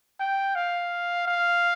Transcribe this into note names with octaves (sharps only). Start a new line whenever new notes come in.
G5
F5
F5